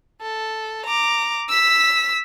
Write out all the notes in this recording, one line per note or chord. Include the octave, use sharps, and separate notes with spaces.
A4
A#5 D6
E6 B6